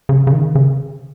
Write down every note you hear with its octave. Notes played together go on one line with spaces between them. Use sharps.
C#3
C#3
D#3
C#3